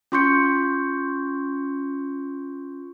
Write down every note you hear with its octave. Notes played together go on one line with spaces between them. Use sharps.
C#4 F4 C6 C#6 G6 C#7